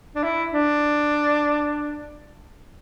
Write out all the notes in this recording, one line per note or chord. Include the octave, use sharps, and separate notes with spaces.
D4
E4
D4